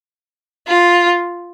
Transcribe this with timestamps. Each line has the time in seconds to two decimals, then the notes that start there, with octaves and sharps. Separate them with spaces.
0.68 F4